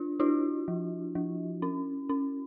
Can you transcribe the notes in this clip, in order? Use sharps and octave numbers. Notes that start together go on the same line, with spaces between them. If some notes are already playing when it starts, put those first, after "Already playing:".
Already playing: D4 F4
D4 E4 F#4
F3
F3
C#4
C#4